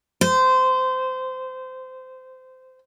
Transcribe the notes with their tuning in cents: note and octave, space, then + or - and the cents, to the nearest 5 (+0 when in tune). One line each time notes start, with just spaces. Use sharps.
C5 -20